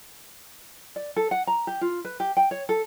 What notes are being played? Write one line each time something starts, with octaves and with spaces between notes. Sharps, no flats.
D5
A4
F#5
A#5
G4
F4
B4
G4
G5
C#5
A4